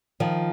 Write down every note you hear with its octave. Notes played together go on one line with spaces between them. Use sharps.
D#3 F3